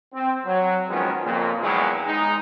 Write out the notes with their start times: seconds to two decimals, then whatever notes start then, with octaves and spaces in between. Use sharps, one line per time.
0.14 C4
0.45 F#3
0.89 D#3 F3 F#3 G#3 B3 C#4
1.24 F2 A#2 C#3
1.61 E2 B2 D#3 E3 F#3 G#3
2.06 G#3 D#4